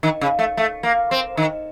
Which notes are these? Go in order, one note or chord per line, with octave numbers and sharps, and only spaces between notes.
D#3
C#3
A3
A3
A#3
C4
D#3